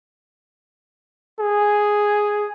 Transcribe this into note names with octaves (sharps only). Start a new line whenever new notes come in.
G#4